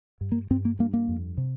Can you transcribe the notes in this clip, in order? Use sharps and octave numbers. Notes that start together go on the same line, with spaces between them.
G2
A#3
G2 C4
A#3
G2 A#3
A#3
F2
C3